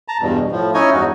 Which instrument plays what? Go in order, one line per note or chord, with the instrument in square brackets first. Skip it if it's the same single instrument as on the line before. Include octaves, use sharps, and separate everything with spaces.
[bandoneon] A5 A#5
E2 G2 B2
A2 F3
C#4 D#4 E4 C#5 D#5 G#5
E2 G2 D#4 F#4